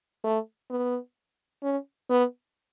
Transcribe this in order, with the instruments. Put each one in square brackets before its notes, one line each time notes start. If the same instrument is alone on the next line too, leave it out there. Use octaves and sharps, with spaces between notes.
[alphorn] A3
B3
C#4
B3